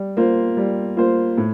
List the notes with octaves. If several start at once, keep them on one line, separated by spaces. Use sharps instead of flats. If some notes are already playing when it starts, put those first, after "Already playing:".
Already playing: G3
A#3 F4 C5
G3
A#3 F4 C5
A2